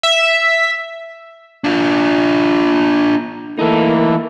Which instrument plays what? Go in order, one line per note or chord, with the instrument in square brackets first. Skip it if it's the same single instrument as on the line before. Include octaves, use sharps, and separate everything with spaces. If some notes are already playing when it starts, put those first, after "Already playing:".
[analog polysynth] E5
[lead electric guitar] D4 F4
[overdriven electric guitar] E3 D#4 [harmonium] A3 E4 A4 [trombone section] A#3